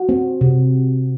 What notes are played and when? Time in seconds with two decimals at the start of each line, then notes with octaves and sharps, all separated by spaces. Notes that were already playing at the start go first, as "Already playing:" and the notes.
Already playing: F#4
0.09 C4
0.41 C3